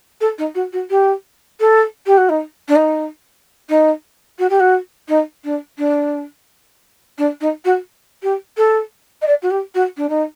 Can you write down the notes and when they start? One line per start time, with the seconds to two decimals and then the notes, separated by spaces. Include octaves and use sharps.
0.20 A4
0.38 D#4
0.55 F#4
0.72 F#4
0.90 G4
1.60 A4
2.06 G4
2.17 F#4
2.29 D#4
2.68 D4
2.75 D#4
3.69 D#4
4.38 F#4
4.49 G4
4.60 F#4
5.08 D#4
5.44 D4
5.78 D4
7.18 D4
7.41 D#4
7.64 F#4
8.23 G4
8.57 A4
9.22 D#5
9.27 D5
9.42 F#4
9.50 G4
9.74 F#4
9.97 D4
10.09 D#4